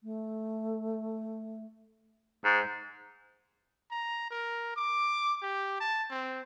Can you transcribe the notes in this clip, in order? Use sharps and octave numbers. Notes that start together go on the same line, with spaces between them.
A3
G#2
A#5
A#4
D6
G4
A5
C4